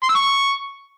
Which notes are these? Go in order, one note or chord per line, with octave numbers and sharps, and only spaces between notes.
C6
E6
C#6